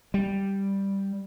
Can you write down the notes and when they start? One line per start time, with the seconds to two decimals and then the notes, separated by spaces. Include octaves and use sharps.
0.14 G3